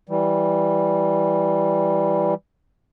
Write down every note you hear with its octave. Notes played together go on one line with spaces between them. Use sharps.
E3 G3